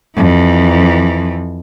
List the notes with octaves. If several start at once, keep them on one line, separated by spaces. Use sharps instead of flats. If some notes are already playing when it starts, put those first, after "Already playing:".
F2 E3